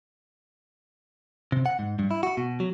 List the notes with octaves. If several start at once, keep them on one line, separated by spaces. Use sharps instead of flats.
C3
F#5
G#2
G2
E4
F#4
B2
F#3